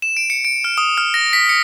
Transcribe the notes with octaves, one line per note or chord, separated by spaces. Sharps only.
E7
D7
C#7
D7
F6
D#6
F6
A#6
B6
C#7